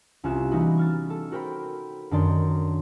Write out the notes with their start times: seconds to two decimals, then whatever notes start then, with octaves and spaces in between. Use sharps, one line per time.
0.24 C2 C#4 F4 F#6 E7
0.51 E3 G3 A#3 B3 D#4 F#4
0.77 C#6 F6 A6
1.10 A4
1.32 F#4 A#4 C5 G5 B5
2.11 F#2 D#3 D4 D5 C6